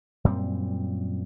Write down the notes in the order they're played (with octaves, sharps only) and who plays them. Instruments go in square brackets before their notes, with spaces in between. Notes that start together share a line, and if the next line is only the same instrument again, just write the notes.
[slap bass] F#2 A#2 G3 C4